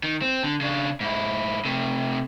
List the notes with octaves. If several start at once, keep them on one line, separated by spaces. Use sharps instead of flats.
D#3
C4
D3
C#3 D4
G#2 E4
C3 A3